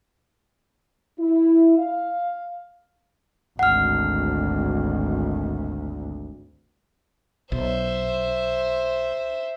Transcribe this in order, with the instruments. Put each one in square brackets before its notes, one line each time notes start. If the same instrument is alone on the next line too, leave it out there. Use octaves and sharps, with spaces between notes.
[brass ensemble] E4
F5
[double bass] G#1 D2 [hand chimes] F#5 F6
[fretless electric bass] B1 [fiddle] C5 E5